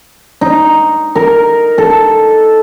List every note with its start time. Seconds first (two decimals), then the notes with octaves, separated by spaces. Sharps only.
0.41 D#4
1.16 A#4
1.78 A4